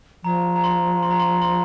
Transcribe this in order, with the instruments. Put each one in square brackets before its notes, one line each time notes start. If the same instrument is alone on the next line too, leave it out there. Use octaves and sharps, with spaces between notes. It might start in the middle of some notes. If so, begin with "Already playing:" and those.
[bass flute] F3 [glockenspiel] A#5
[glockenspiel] A#5
C6
C6
A#5
C6
C6